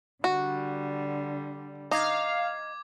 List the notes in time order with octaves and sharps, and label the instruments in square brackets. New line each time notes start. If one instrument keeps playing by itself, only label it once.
[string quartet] D3 G3 [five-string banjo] F#4
[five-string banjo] D#4 [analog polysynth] F5 [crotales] D6 G#6